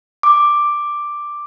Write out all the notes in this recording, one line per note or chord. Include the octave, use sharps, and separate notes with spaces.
D6